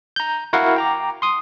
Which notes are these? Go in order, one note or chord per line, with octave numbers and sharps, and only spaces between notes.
A#5 G6
E4 F#4 A#4 F5 F#5
G5 A#5 D6
C6 D#6